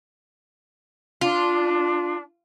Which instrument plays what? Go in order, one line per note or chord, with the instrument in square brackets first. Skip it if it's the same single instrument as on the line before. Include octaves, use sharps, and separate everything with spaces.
[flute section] D4 [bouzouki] F4